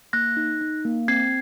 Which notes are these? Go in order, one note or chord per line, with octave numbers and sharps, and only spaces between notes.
A#3 F#6 A#6
D#4
D#4
A#3
C4 G#6 C7